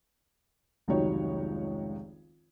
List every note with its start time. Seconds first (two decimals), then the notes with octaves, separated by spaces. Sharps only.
0.88 F1 C#2 D#3 F#3 D#4 C#5